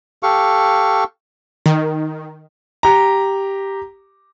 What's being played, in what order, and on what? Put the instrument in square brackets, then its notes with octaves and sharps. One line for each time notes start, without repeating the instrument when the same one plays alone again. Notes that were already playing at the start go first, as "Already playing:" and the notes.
[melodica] G4 A4 F5 C#6
[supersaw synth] D#3
[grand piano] G4 A#5